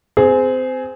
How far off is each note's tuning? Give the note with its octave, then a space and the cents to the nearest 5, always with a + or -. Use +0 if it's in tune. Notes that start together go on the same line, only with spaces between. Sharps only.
C4 -25 G#4 +5